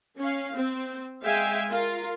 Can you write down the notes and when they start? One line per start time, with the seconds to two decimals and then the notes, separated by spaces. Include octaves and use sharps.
0.19 C#4 F5
0.56 C4
1.24 G#3 E5 F5 G5 G#5
1.72 F4 A#4